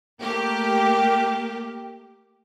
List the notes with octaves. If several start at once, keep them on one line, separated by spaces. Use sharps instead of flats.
A3 A#3 G4